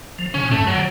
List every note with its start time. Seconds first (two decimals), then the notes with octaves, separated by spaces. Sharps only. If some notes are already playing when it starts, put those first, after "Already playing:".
0.19 F3
0.35 C#3 C#4
0.43 B2
0.51 G#2 A3
0.59 F#2
0.67 F#3
0.75 D3